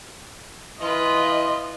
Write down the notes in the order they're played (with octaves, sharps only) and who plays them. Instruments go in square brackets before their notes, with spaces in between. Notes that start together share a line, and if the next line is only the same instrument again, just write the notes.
[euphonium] E3 [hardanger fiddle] F4 B4 [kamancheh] D#5 [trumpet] C6